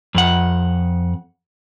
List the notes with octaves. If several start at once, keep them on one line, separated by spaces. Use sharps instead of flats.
F2 F#5